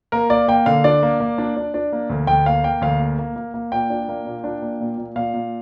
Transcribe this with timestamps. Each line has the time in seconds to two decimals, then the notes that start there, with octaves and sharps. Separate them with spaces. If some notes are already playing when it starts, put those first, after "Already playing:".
0.12 A#3 A#4
0.30 A#3 D5
0.48 A#3 G5
0.66 D3 F5
0.84 D4 D5
1.03 A#3
1.20 A#3
1.38 D4
1.56 D4
1.74 D4
1.92 A#3
2.10 D2
2.27 D2 G5
2.46 A#3 F5
2.64 A#3 G5
2.81 D2 F5
3.00 A#3
3.19 A#3
3.36 A#3
3.54 A#3
3.72 A#2 G5
3.90 D4
4.09 A#3
4.26 A#2
4.44 D4
4.62 A#3
4.80 A#2
4.98 A#2
5.16 A#2 F5
5.34 A#2